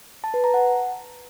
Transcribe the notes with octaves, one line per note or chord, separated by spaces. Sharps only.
A5
B4
A#5
F#5